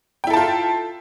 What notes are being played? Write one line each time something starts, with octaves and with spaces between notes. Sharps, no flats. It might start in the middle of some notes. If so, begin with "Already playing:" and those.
E4 F4 A4 G5 A5